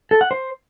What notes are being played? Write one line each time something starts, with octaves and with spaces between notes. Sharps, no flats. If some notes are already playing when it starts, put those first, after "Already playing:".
A4
F#5
C5